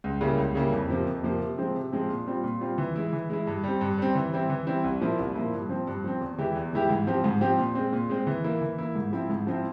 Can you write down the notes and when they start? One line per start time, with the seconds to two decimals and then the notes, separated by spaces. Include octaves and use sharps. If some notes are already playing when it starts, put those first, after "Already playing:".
0.04 C#2
0.21 C#3 G3 A#3 E4
0.38 C#2
0.55 C#3 G3 A#3 E4
0.72 F2
0.89 C3 F3 A#3
1.07 F2
1.23 C3 F3 A#3
1.40 C3
1.58 F3 G#3 C4
1.75 C3
1.92 F3 G#3 C4
2.09 A#2
2.26 G3 C4 F4
2.44 A#2
2.61 G3 C4 F4
2.78 E3
2.95 G#3 E4
3.13 E3
3.30 G#3 E4
3.47 G2
3.64 G3 C4
3.81 G2
3.98 G3 C4
4.15 E3
4.33 G3 C4 E4
4.50 E3
4.67 G3 C4 E4
4.84 C2
5.00 A#2 F3 A#3 E4
5.19 C2
5.35 A#2 F3 A#3 E4
5.53 G2
5.69 F3 C4
5.87 G2
6.04 F3 C4
6.21 E2
6.38 E3 G#3 E4 G4
6.55 E2
6.73 E3 G#3 E4 G4
6.89 G#2
7.07 F3 C4 G4
7.24 G#2
7.41 F3 C4 G4
7.58 A#2
7.75 G#3 C4
7.93 A#2
8.09 G#3 C4
8.27 E3
8.44 A#3 E4
8.61 E3
8.78 A#3 E4
8.95 G#2
9.13 F3 C4 E4
9.30 G#2
9.47 F3 C4 E4